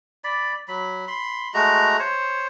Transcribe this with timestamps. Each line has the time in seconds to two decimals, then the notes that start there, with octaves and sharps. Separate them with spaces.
0.24 D5 B5
0.68 F#3 B5
1.08 B5 C6
1.54 G#3 A3 F#4 A#5
1.99 C5 C#5